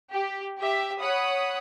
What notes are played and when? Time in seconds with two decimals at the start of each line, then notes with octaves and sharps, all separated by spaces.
0.11 G4
0.58 G4 E5
0.99 C#5 F#5 B5 D#6